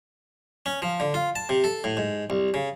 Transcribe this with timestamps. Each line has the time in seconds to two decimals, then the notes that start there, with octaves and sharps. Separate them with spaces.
0.66 C#4
0.82 F3
1.00 D3
1.14 F4
1.36 A5
1.49 C3
1.64 A4
1.84 A2
1.97 G#2
2.30 C2
2.54 C#3